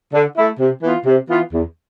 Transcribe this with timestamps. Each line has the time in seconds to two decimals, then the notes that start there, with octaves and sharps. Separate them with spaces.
0.13 D3
0.36 A3 E4
0.59 C3
0.83 E3 B3 F4
1.06 C3
1.29 E3 B3 F4
1.52 E2